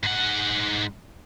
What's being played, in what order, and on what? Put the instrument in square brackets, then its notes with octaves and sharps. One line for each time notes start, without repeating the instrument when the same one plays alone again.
[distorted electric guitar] G#2 F#5